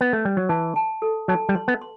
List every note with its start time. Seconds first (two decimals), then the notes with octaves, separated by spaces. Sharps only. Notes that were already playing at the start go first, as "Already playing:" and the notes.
0.01 B3
0.13 A3
0.25 G3
0.37 F#3
0.49 E3 A5
0.76 A5
1.02 A4
1.28 F#3 A5
1.49 G3
1.55 C6
1.68 B3
1.82 C6